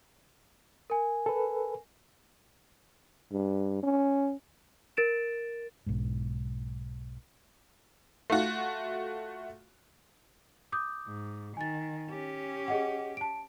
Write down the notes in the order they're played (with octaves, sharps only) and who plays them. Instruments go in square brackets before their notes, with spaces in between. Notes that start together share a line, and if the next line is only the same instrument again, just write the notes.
[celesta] A#4 G#5
[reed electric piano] A4 B4
[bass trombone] G2
C#4
[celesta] A#4 A6 D7 E7
[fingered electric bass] B1 G#2
[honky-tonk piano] A3 F4 F#4
[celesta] D6 D#6 G6
[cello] G#2
[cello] D#3 [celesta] G#5 A6
[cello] C#4 G4
[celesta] G#4 D#5 F#5
A5 D7